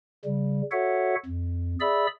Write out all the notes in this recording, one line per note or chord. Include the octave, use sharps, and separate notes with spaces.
C#3 G3
F#4 A4 C#5 E5 F#5
F2
G#4 D5 E5 B5 E6